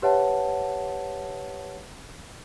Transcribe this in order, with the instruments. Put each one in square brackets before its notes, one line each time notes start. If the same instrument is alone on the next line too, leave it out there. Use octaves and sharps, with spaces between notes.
[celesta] G4 B4 C#5 E5 F#5 A5